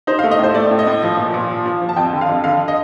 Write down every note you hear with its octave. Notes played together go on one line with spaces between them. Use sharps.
D#4 C5
F5
A3
D#5
A2
C5
A3 D5
A2
D#5
A2
F3
A#2
A#2
F3
F3
F3
A5
F2 G5
D3
F5
F2
D3 F5
D#5